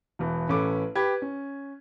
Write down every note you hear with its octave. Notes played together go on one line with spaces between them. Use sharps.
E1 E3
A1 C#4 A4 B4 D6
G4 B4 G#6
C#4